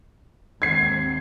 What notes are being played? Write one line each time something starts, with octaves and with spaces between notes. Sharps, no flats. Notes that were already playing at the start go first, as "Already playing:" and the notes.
D#2 G#2 C4 G#6 C7